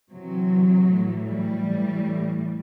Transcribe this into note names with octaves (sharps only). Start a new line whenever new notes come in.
C3 E3 F#3
A2 E3
G3
A2 E3